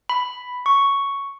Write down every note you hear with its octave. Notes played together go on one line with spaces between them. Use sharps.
B5
C#6